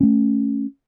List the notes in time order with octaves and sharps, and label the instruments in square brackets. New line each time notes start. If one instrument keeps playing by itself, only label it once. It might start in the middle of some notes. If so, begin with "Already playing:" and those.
[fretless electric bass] A3 C#4